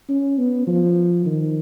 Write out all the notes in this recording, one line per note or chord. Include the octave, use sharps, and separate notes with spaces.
C#4
B3
F3
D#3